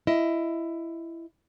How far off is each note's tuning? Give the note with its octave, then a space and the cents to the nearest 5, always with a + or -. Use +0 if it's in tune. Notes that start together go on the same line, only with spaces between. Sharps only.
E4 +15 D#5 +15